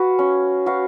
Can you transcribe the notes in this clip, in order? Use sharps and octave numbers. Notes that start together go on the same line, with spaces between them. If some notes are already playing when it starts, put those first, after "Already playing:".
Already playing: F#4 B4 F5
C#4
F#4 B4 F5